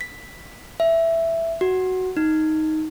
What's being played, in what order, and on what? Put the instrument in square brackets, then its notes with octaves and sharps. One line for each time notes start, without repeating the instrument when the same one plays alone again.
[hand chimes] B6
E5
F#4
D#4